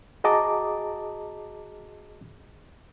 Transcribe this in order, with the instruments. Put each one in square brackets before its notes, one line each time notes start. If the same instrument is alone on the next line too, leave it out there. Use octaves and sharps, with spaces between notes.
[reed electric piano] F#4 G#4 D#5 A5 A#5 D6